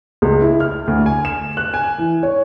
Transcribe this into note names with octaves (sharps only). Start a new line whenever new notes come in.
C#2
E4
F6
D2
G#5
E7
F#6
G#5
E3
C#5